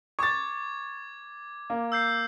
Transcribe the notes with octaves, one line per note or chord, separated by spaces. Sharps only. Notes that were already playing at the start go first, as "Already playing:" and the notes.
C#6 D6 G#6 A6
A#3
E6 G6 C7